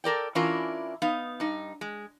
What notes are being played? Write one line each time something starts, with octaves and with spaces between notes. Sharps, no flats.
A4 A#4 D5 G5
E3 C#4 D4 E4 F4 A#4
B3 D#4 F5
G2 D#4
G#3